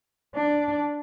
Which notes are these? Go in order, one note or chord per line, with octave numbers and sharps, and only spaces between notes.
D4